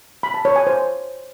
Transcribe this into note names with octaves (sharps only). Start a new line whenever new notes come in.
B5
A5
C#5
G#5
C5